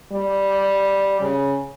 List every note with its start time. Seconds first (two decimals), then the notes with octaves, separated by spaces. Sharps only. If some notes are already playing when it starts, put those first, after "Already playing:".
0.12 G3
1.21 C#3